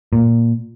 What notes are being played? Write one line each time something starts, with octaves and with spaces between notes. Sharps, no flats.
A#2